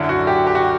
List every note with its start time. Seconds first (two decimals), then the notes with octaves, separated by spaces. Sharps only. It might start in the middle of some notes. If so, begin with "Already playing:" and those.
Already playing: F#2 D3 E4
0.09 F#4
0.27 G4
0.47 G4
0.55 F#4